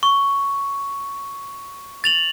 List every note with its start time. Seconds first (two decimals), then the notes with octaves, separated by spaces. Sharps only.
0.03 C#6
2.04 A6 F7 F#7